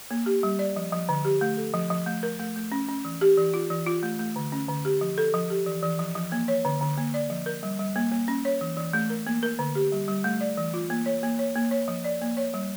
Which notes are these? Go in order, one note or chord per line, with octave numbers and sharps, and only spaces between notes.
A#3
G4
G3
D5
F3
F3
D3
G4
A3
A4
F3
F3
A3
A#4
A3
A3
C#4
C#4
E3
G4
E3
F4
E3
F4
A3
A3
D3
C#4
D3
G4
F3
A4
F3
G4
E3
E3
F3
F3
A#3
C#5
D3
D3
A#3
D5
F3
A#4
G3
G3
A#3
A#3
C#4
C#5
E3
E3
A3
A#4
A#3
A#4
D3
G4
G3
G3
A3
D5
E3
F4
A#3
C#5
A#3
C#5
A#3
C#5
F3
D5
A#3
C#5
G3